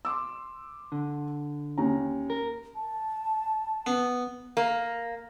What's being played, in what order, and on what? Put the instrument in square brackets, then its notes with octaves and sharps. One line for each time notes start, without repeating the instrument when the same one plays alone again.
[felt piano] C6 D6 E6
[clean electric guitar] D3
[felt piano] D#2 C#4 A#5
[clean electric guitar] A#4
[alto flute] A5
[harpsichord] B3
[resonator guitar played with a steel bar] A#3